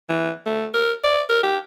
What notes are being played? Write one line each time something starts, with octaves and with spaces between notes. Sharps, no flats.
E3
A3
A#4
D5
A#4
G4